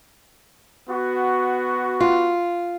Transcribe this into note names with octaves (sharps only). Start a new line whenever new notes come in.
B3 F#4
F4